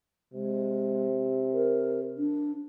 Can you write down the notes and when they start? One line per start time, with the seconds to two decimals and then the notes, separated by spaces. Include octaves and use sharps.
0.34 C3 G#3
1.53 A#4
2.17 D4